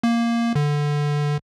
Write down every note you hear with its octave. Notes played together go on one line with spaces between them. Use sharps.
A#3
D3